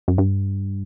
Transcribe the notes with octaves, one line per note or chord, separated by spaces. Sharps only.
F#2
G2